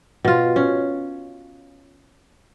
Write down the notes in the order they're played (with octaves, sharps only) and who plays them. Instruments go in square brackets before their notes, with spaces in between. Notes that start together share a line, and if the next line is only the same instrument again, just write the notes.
[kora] B2 F4
C#4